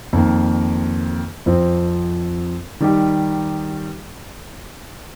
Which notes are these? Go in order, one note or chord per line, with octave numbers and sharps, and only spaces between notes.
F2 D#3 A#3
F2 F3 C4
D#3 G3 D#4 G4